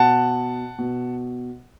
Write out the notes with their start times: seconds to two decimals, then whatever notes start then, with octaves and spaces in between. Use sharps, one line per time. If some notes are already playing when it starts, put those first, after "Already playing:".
Already playing: B2 F#5 A5
0.79 B2